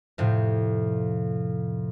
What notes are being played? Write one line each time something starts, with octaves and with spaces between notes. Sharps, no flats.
F2 A2 C3